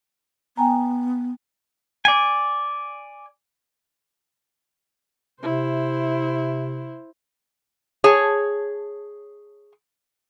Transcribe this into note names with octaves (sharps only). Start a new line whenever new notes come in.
B3 G5 G#5 A#5
D5 G#5
C3 E4 C5
G#4 C#5 A5